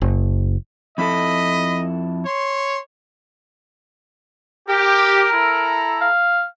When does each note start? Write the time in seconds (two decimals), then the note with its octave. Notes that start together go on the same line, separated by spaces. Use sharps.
0.02 F#1
0.98 F2 E4 A4 D#5 B5
2.26 C#5 C6
4.69 G4 A#4
5.31 E4 A4 A#5
6.01 F5